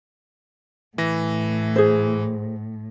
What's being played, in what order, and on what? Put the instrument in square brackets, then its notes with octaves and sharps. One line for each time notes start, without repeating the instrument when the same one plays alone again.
[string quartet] A2 [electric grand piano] E3 A#6
[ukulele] G#4 C5